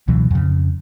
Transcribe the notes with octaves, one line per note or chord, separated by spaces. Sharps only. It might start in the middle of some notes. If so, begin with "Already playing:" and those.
C#2 B2 E3 F#3
F2 C#3